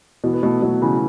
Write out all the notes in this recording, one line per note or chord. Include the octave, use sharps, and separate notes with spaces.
B2 E3
B3
B2 A3
B2 F#3
C#3 E3